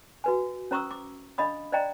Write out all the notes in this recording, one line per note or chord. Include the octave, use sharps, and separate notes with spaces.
F#4 B4 G#5
C#4 C5 A#5 C#6 D#6 E6
D6
D4 D#5 F5 B5 D#6
C5 D5 D#5 F5 G5 A#5